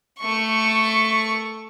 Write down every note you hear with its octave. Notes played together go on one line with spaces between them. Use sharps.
A3 C#6